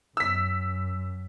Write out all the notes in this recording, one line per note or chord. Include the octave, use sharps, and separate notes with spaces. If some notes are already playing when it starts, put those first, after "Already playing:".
F#2 E6 B6